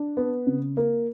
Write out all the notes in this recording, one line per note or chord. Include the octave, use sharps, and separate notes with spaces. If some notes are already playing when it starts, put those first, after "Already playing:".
Already playing: D4
B3
C#3
A#3